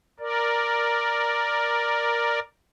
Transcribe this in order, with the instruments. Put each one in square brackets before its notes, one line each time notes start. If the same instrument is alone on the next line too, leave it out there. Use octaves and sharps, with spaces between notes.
[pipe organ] A#4 D5